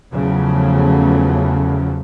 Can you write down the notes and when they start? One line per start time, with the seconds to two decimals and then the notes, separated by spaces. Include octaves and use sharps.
0.12 E2 C#3 F3 F#3 A3